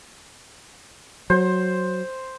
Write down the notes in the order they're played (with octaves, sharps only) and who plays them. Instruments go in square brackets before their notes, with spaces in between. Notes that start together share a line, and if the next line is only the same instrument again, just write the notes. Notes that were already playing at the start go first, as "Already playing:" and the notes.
[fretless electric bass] F#3 [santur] C5